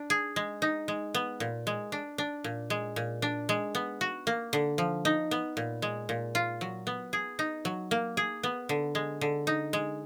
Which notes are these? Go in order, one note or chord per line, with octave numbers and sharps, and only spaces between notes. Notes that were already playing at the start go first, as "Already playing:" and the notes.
Already playing: D4
G#4
G#3
D#4
G#3
B3
A#2
G#3
D4
D4
A#2
G#3
A#2
D4
G#3
B3
F#4
A#3
D3
F3
D#4
B3
A#2
G#3
A#2
F4
F#3
B3
G#4
D#4
F#3
A#3
G#4
B3
D3
G#3
D3
D#4
G#3